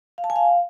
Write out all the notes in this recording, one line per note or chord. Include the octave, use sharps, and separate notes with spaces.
F5
A5
G#5
F5